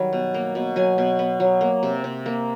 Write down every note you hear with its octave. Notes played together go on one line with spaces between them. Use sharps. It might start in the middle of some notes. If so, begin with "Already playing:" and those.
Already playing: D#3 F#3 G3
B2
A#3
B2
F#3 G#5
B2
B3
F#3
A#3
C3
C3
A#3